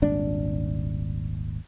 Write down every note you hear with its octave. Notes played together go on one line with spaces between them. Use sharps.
D#1 G#1 D4